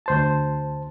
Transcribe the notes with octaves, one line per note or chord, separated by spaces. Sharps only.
D2 C5 A5